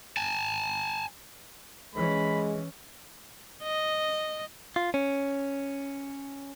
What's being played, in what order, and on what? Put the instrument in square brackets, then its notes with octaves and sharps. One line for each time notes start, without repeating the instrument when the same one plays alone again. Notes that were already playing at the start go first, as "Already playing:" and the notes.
[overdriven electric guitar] G#5 A5
[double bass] E3 C#4 [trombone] G#3 [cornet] B5
[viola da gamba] D#5
[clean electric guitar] F4
C#4